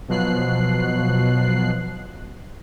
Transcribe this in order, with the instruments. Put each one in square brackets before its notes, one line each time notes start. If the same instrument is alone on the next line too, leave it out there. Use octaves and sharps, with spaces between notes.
[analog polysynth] B2 F3 F#3 F#6 C7